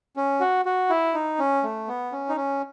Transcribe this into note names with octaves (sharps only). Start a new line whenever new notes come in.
C#4
F#4
F#4
E4
D#4
C#4
A3
B3
C#4
D#4
C#4